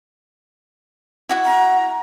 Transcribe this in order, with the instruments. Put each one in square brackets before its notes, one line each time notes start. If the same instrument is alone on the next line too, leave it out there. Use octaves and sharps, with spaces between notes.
[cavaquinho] E4 F#4 F#5
[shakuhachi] A#5